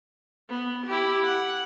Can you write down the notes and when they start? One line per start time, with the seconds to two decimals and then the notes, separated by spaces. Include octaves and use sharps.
0.50 B3
0.87 E4 G4
1.24 F#5